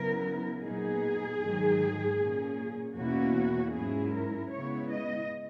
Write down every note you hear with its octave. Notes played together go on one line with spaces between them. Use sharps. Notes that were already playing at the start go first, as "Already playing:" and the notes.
Already playing: C#3 F#3 B3 E4 A#4
A#2 F#3 B3 D#4 G#4
G#2 D#3 F#3
A#2 A#3 C#4
E2 B2 A#3 C#4 E4 F#4
G#2 F#3 C#4 E4 G#4
A#4
C#3 G#3 B3 E4 C#5
D#5